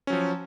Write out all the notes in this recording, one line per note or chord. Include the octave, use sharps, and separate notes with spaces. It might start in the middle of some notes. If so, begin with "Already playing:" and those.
F3 F#3 C#4